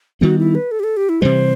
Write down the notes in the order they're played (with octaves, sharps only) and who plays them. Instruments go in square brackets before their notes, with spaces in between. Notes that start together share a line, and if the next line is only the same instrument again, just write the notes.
[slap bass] D#3 G3 B3 [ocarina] F#4
[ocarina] E4
B4
A4
G4
A4
G4
E4
[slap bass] C3 E3 G3 [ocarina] C5